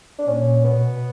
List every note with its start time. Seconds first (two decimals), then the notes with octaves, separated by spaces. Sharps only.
0.19 D4
0.27 A#2 C#4
0.65 B2 B3